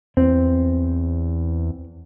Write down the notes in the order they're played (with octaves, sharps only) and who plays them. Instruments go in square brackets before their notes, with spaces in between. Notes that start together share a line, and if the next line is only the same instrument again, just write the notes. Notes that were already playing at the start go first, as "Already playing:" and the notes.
[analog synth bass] E2 [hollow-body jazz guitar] C4